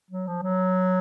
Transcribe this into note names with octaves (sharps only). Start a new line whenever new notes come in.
F#3
F3
F#3